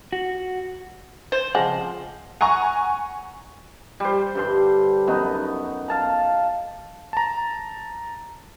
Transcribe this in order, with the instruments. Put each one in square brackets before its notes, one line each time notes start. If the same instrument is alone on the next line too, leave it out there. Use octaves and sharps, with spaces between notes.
[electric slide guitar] F#4
[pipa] C5
[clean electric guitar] C#3 F#5 [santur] F3 C4 F5 [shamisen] G#3
[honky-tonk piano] F#5 G#5 A#5 C#6
[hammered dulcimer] G3 C5
G2 D3 C6
F#2 B3 D#4
F5 A5 A#5
[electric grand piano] A5 A#5